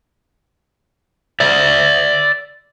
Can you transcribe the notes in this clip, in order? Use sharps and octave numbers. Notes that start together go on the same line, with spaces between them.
D5 E5